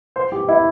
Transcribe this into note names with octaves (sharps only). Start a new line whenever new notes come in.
C5
G4
E4